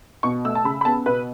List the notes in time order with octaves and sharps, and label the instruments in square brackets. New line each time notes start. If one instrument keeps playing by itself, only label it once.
[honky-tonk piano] B2 C#6
A3 E6
A5
C#3 B5
B5
B3 A5
B2 B4